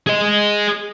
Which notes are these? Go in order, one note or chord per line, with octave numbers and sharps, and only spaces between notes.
G#4 D#5